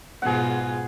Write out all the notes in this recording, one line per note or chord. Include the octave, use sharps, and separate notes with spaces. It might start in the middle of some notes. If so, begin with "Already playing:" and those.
G#2 B2 F4 G#4 F#5